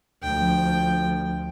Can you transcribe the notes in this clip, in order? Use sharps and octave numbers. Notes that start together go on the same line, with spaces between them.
D2 F3 G5